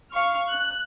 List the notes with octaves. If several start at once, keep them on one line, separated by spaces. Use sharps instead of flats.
F5 C#6 F6
F#6